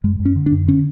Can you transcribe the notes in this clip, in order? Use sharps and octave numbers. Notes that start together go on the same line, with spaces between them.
F#2 G#3
F#2
C#4
D3
D4
F#2
D3 C#4